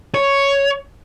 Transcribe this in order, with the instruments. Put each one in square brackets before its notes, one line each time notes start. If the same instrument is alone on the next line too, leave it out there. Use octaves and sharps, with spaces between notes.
[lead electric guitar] C#5